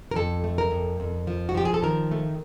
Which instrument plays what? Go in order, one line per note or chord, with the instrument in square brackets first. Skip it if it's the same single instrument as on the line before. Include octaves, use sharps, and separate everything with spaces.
[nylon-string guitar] A#4
F2 A4
A3
A#4
F2
F2
F3
F#4
F3 G4
G#4
A4
D#3 A#4
A3